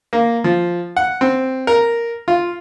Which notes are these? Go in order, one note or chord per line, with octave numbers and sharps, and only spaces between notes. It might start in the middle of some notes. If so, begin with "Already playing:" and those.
A#3
F3
F#5
C4
A#4
F4